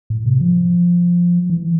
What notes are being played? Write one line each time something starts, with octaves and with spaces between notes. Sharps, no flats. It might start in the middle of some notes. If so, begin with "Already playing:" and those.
A2
C3
F3
E3